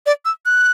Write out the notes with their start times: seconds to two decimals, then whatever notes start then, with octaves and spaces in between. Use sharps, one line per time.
0.06 D5
0.25 E6
0.46 F#6